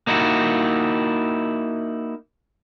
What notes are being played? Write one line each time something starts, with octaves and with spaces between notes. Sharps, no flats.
A#3 D#4 E4 F#4